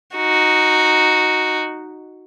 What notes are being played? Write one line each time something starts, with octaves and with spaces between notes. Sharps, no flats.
D#4 F#4